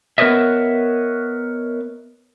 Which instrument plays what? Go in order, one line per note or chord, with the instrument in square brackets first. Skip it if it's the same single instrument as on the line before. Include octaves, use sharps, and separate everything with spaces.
[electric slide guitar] B3 A#4 B4 C#5 D#5 E5